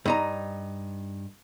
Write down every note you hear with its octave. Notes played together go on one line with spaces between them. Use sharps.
G2 D#4 A#5